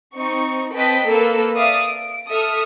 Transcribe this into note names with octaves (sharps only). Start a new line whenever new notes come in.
C4 D#4 C#6
C4 B4 D#5 G5 A5 B6
A#3 A4 B4 E6
D5 E5 F5 D#6
D7
A4 E5 D#6 F6